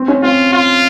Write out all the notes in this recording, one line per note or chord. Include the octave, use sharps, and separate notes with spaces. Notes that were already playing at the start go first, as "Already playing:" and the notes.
Already playing: C4
C#4
C4 F4
F4